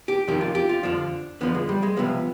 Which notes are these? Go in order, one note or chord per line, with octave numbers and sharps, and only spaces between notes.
G4
F2 C3 D#3 G4
F4
G4
F4
F2 D3 F3 D4
F2 D3 F3 B3
G#3
G3
G#3
C2 C3 F3 B3